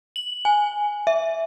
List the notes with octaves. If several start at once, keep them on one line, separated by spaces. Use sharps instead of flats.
F#7
G#5
E5